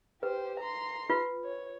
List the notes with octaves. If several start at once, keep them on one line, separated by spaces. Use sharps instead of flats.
G4 B4 C5
A#5 C6
F4 B4
C#5